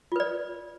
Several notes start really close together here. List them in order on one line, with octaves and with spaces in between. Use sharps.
F4 B4 D5